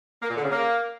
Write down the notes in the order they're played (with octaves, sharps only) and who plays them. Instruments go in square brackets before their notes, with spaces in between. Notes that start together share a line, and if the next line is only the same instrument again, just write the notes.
[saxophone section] A#3
A#2
D3
C#3
A#3